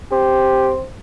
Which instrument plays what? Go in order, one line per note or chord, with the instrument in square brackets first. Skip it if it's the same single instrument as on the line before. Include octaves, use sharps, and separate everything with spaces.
[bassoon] C4 [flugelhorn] G4